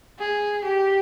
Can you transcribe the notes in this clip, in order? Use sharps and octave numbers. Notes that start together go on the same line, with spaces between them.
G#4
G4